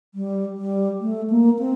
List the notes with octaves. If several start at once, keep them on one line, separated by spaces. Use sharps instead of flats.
G3
G3
A3
A#3
C4